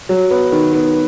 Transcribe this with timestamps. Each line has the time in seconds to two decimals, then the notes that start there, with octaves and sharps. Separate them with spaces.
0.09 F#3
0.31 B3
0.52 D#3
0.73 B3